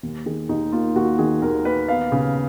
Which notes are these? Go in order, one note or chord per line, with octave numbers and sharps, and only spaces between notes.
D#2
D#3 G#4
D#2 D#4
A#3 F4
D#2 F#4
D#3 G#4
D#2 A#4
A#3 B4
B3 F5
C#3